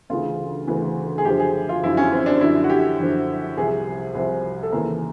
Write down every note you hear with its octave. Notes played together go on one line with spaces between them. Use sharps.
D2 C#3 E3 F4
D2 C#3 E3
G#4
F#2 D3 F3 G4
G#4
F4
F#2 D3 F3 E4
C#4
C4
D4
F#2 D3 F3 E4
F#4
G4
F#2 D3 F3
C2 C3 F3 G#4
C2 C3 F3
A4
D#2 C#3 E3 A#4